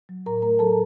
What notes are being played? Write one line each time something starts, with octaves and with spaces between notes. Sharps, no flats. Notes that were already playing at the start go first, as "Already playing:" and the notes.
F#3
A2 A#4 A#5
A3 A#4 A#5
F#3 A4 A5